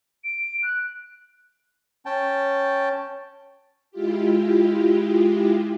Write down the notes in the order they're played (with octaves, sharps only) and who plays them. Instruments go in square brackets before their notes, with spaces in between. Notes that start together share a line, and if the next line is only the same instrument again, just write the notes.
[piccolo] D7
F#6
[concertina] C#4 G5 A5
[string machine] G#3 E4 F4 G4